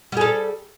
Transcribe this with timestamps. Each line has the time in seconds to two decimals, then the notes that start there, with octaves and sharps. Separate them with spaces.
0.12 G3
0.17 G#4
0.21 A4